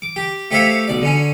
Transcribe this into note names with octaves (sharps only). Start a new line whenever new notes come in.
D6
G4
A3 G4 C5 C#5 E5 F5
B1 D5
D3 C#4